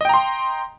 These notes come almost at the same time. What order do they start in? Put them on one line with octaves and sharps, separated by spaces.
D#5 G5 A#5 C6